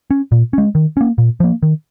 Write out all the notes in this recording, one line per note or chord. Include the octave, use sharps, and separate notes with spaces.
C#4
A#2
G#3 C#4
D#3
A#3 C#4
A#2
F3 A#3
D#3